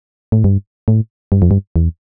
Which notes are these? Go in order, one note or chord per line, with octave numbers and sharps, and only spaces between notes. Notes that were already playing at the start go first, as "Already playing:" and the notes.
A2
G2
A2
G2
F2
G2
E2